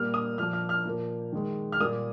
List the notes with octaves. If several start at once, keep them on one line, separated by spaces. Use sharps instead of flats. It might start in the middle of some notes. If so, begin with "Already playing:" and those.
Already playing: A#2 G3 A#3 F6
D#6
A#2 F3 A#3 F6
F6
F6
A#2 F3 A#3
D#3 G#3
F6
A#2 G3 A#3 D#6